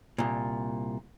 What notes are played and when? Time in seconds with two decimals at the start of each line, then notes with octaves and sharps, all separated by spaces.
0.18 C2 A#2